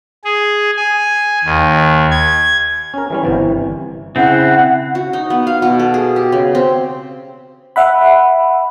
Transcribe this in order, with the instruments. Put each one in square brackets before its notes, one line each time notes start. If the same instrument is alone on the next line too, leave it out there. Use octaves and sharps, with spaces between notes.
[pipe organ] G#4
G#5
D#2
G#6
[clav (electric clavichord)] C#4 A#4
E3 G3 C#4
G1 C3 E3
[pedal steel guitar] C#3 C4 [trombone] E4 [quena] F#5
[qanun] F#4
D#4
B3
F5
B2
A4
G#4
G4
C#3
C4
[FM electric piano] E5 F#5 B5